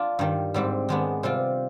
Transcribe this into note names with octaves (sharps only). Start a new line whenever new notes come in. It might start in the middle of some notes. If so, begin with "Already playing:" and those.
Already playing: D4 F4
G2 D#3 G3
G#2 G3 C4 G4
D#3 G#3 B3 D4
C3 G3 C4 F4